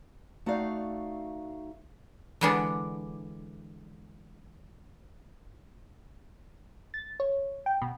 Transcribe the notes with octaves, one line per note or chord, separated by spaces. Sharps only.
A3 D#4 F#4 D5 F5
D3 E3 G#3 B3 D4
A6
C#5
G5
B2